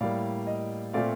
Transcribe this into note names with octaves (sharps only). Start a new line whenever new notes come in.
A2 G3 A#3 D5 F5
D#5
A#2 A3 C4 D5 F5